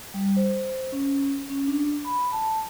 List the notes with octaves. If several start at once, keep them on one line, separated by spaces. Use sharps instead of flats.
G3
C5
C#4
C#4
D4
B5
A5